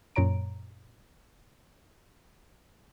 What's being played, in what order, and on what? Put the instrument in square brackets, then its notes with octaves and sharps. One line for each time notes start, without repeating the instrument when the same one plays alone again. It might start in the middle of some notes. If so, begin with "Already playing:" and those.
[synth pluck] F#2 A#2 C#5 A#5 D7